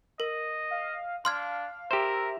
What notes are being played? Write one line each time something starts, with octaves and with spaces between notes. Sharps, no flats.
A#4 D#5
F5
D4 F5 C6 F6 G#6
G4 A#4 C5 E5